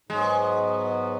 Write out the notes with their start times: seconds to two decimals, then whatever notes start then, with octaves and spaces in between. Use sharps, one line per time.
0.09 G#2 F#3 G#3 B3